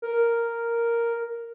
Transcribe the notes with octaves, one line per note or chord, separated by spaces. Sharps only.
A#4